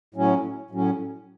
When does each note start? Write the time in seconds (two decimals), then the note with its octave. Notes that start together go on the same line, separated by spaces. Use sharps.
0.15 A2 F#3 C#4
0.71 A2 F#3 C#4